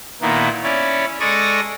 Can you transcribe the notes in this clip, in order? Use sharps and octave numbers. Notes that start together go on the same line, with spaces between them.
A#2 D#3 A#3 B3 E4
C#4 E4 C#5 D5
G#3 A4 D5 C#6 D#6 A#6